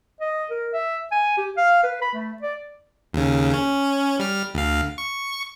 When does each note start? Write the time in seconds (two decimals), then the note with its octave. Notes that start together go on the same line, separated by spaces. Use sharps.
0.20 D#5
0.51 A#4
0.73 E5
1.11 G#5
1.37 G4
1.57 F5
1.83 B4
2.02 B5
2.14 A3
2.42 D5
3.13 D#2 C#3
3.54 C#4
4.19 G3 F6
4.54 D2 F5
4.98 C#6